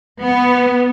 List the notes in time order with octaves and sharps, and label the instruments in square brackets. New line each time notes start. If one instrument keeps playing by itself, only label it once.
[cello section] B3